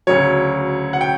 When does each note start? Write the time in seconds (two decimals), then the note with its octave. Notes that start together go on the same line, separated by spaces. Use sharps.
0.07 D2 C#3 F#3 C#5
0.93 F#5
1.01 G5